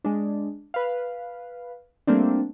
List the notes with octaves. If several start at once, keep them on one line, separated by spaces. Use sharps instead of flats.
G#3 D4
B4 F5
G3 A3 A#3 C4 D4